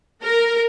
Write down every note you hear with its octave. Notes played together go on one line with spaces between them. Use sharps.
A#4